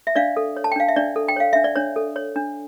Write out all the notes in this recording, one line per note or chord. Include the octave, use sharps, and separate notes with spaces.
E5
D4 D5 F5
A4
C#5
A5
G5
D4 F5
E5
D4 D5
A4
G5
C#5 F5
D4 E5
D5
D4 C#5
A4
C#5
D4